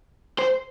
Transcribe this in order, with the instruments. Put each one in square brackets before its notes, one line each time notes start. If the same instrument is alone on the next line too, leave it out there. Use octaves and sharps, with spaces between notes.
[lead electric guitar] C5